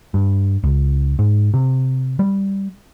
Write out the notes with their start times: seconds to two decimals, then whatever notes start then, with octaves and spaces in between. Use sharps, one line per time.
0.14 G2
0.64 C#2
1.19 G#2
1.54 C3
2.19 G3